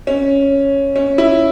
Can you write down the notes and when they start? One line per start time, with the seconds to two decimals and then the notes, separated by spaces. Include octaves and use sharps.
0.07 C#4
0.96 C#4
1.18 E4